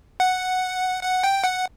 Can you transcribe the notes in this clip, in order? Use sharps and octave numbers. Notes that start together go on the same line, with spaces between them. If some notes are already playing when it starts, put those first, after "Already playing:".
F#5
F#5
G5
F#5